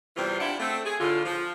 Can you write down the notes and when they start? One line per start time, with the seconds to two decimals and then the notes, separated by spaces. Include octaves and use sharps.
0.17 E2 C3 E3 G3 F4 C5
0.40 D4 E4 F4 G4 E5 F#5
0.60 A3 C4
0.84 G#4
1.00 A2 D3 F4
1.25 F3